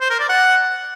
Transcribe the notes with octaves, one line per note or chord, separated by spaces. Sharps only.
C5
A#4
D5
F#5